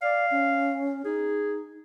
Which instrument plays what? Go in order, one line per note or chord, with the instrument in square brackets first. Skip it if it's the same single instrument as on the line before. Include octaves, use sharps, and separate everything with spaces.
[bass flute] D5 [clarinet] F5
[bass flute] C#4
[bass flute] D#4 [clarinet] G#4